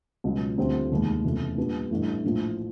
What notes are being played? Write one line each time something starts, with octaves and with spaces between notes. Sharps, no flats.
C#2 B2 F#3
D2 D3 G3 C4 F4
F1 D#2 D#3 G#3
F1 E2 C#3 F3 A3
A#2 G3 B3 D4
A1 G2 E3 A3
A#1 A2 F3